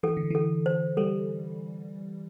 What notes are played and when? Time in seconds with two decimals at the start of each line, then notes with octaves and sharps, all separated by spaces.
0.03 E3 A4
0.17 D3
0.30 E3 A4
0.66 C5
0.97 G3 A4